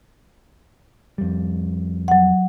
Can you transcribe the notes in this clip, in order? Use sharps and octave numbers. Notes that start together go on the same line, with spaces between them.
F2 G3
F#3 F#5